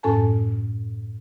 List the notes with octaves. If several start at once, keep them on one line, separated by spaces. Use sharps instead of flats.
F#2 A2 C#4 A4 G#5 A5